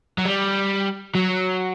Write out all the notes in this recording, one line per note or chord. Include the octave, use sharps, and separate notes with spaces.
F#3
G3
F#3